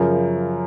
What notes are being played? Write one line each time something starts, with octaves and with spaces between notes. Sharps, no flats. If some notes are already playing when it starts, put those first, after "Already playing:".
Already playing: F#2 C#3 F3 A#4